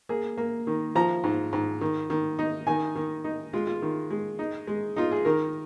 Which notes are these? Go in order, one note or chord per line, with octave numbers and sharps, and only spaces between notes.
A#3 G#4
A#3
D#3
F3 A#5
G#2
G#2
D#3
D#3
D#4
D#3 G#5
D#3
D#4
G#3 F4
F4
D#3
G#3
D#4
G#3
D#4 F4
G#4
D#3 A#4